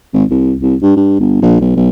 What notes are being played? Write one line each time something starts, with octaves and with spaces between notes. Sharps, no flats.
G#1
C2
C2
G2
G2
G1
A#1
B1
B1